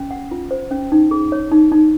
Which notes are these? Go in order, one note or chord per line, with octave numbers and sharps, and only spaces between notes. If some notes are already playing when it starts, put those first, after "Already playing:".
Already playing: C#4
F#5
F4
C5
C#4
D#4
G#4
C#5
D#4
D#4